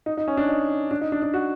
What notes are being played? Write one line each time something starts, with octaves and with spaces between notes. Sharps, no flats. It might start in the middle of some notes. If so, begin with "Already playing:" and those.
D#4
D#4
C#4
D4
D#4
D4
D#4
D4
D4
F#4